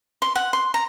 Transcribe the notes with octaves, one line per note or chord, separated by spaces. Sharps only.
C6
F#5
C6
A#5